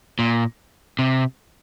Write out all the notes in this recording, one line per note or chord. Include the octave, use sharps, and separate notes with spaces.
A#2
C3